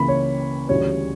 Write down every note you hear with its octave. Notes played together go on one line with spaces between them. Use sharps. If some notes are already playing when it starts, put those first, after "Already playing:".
Already playing: C#2 C#3 E3 A#3 B5
C#5
D2 C#3 E3 G3 C#5